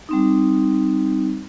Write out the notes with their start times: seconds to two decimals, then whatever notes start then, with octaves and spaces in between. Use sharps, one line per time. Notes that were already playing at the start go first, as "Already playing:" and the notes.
0.09 G3 C4 D#4